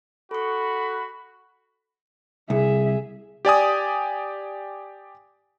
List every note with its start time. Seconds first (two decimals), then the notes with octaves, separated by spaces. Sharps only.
0.31 F#4 A4 B5 C#6
2.50 C2 G#4 E5
3.45 G4 D5 G#5 D#6